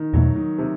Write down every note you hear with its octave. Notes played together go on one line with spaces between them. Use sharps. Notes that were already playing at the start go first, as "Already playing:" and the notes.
Already playing: D#3
E2 B2 F#3 A3
D#3
C3